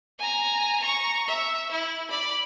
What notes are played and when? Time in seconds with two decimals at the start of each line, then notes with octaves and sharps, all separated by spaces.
0.19 G#5 A#5
0.80 A#5 C#6
1.27 E5
1.71 E4
2.10 D5 B5